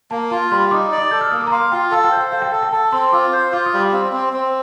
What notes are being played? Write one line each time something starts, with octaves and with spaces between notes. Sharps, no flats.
A#3 A5
F4 A5
G3 C6
D#4 D6
D5
D6
A4 G6
F6
A#3 D#6
D6
A#5
F5 C6
F4 G5
A4 F5
G5
C5
F5
A4 F5
G5
A4 F5
G5
A4 A5
C4 C6
F4 D6
C5
F4 D6
D#6
G3
D6
C4 F5
C4
C4